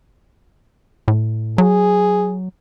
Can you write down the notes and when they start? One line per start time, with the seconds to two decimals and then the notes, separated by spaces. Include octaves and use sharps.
1.08 A2
1.58 F#3 G#4